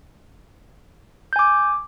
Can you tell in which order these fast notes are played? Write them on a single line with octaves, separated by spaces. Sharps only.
G6 G#5 D6